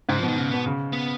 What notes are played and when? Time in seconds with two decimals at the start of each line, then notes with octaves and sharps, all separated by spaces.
0.09 G#2 C#3
0.18 F3
0.23 B2
0.28 D#3
0.38 C#3
0.51 B2 B3
0.66 C#3
0.93 B3